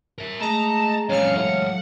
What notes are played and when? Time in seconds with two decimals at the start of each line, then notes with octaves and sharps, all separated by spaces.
0.18 A#4 E5
0.41 G#3 A3 D#5 A5 A#5
1.09 F2 A#2 F#3 G#3 C#4 F5 F6 C#7
1.36 A2 F#5